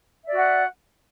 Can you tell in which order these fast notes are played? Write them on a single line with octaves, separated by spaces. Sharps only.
E5 D5 F#4 F#5